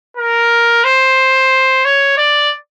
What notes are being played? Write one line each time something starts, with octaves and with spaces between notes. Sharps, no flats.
A#4
C5
C#5
D5